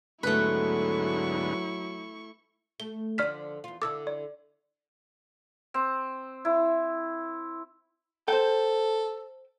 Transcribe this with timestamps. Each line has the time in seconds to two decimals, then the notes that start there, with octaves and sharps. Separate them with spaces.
0.23 D2 G#2 F#3 A3 B3 E4 B4 C#6
2.80 A3 G7
3.18 D3 F3 D4 D5 F6 B6
3.64 E2 F4
3.82 D3 E4 A4 D6 E6
4.07 D5
5.74 C4
6.45 E4
8.28 A4 C5 G5